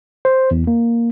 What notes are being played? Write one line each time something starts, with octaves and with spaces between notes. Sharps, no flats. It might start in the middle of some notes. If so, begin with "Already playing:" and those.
C5
E2
A#3